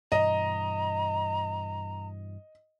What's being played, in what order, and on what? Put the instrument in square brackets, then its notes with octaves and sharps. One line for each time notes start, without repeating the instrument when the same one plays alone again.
[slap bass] G2 B2 E3 [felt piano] D#5 [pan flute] A#5